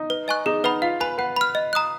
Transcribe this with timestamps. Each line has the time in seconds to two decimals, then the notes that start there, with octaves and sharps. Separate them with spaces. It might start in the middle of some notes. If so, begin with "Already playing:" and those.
Already playing: D#4
0.10 B4
0.28 D#5 G#5 C#6 F#6
0.46 D#4 G#4
0.64 D#4 B4 D#5 F#5 B5
0.82 F4 F5
1.00 B4 G#5 B5
1.18 B4 F#5
1.36 B5 F6
1.55 D#5
1.73 A#5 D#6 F#6